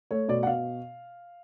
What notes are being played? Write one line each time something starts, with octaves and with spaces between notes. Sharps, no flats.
A3 C#5
B2 D5
F#5
B2 F5